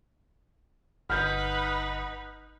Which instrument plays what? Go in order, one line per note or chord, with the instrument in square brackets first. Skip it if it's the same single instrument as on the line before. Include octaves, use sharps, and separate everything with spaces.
[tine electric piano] G1 F#5 B6 [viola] D#4 B4 [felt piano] F6 G6